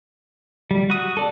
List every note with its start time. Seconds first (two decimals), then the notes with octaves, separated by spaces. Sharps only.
0.71 G3
0.90 F#4 D#6
1.17 A4 D5